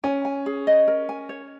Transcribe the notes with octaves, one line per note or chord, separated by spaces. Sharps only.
C#4 G#5
G#5
G#4
D#5
A#4
G#5
C#5